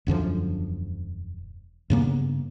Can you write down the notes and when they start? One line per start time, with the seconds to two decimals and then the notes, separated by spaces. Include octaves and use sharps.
0.07 E1 F#2 D3 F3
1.90 G2 C#3 A#3 B3